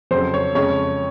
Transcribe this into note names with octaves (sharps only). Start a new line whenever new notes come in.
F2 C#3 F#3 C5
C#5
F2 C#3 G#3 C#5